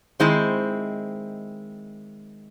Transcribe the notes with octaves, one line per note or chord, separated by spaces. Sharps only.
D#3 G#3 C4 E4 C5